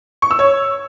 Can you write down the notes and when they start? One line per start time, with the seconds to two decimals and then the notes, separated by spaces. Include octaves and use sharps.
0.22 C#6
0.31 E6
0.39 C#5